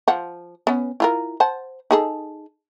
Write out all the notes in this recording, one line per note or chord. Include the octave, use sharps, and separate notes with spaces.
F3 F#5
B3 C#4
E4 F4 A#4
C5 F#5 A5
D#4 G#4 A4